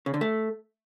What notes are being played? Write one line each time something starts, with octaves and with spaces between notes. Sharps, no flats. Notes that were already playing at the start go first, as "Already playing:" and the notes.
C#3
D3
A3